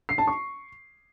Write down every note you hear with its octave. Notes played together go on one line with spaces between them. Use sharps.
C7
A5
C#6